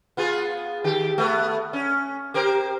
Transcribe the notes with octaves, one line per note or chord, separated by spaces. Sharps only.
B3 F4 G#4
D#3 G4
A3 B3
C#4
G4 A#4 C5